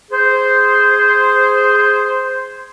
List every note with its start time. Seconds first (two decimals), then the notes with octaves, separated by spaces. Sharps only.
0.11 G#4 C5